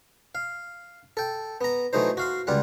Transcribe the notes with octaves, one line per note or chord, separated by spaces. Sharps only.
F5
A4 G5
B3 A#5
E3 F#3 A3 D#4 C5
F#4 F5 C6
C#2 G3 F4 F#5